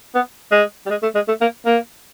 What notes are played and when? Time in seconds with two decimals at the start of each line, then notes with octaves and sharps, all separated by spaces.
0.15 B3
0.51 G#3
0.86 G3
0.90 G#3
1.03 A3
1.15 G#3
1.28 A3
1.41 A#3
1.66 A#3